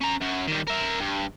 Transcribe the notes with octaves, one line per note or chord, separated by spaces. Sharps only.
C#4 A#5
F#2 F#3
D#3 G3
A#4 E5
G2